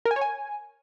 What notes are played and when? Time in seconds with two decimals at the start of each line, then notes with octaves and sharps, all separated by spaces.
0.05 A#4
0.11 G#5
0.16 C#5
0.21 G#5